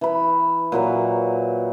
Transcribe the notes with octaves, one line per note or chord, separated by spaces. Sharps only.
E3 B5
A#2 F#3 B4